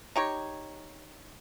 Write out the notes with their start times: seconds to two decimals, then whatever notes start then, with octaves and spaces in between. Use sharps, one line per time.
0.16 D#4 G4 C#5